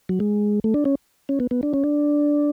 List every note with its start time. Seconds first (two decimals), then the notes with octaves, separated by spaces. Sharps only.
0.09 F#3
0.20 G#3
0.64 A3
0.74 D4
0.85 C#4
1.29 C#4
1.40 B3
1.51 B3
1.63 D4
1.74 C#4
1.84 D4